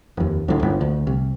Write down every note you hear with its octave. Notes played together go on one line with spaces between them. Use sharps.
F1 D#2
D1 D2
G1
D2
C2